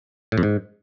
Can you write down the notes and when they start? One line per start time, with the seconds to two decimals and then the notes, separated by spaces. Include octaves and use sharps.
0.32 A2
0.38 F2
0.43 G#2